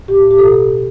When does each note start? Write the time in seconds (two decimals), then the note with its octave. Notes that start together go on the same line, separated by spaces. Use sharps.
0.08 A2 G4
0.23 A2
0.31 G4
0.38 B2 A4